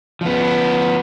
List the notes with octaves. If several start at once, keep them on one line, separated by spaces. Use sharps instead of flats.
F3 B3